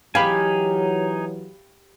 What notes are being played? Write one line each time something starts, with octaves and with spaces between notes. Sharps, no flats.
E3 F#3 D#4 G4 F5 G#5 B5